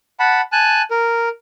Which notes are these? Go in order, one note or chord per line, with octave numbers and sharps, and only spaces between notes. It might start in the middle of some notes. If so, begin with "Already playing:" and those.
F#5 A5 B5
G#5 A5 F#6
A#4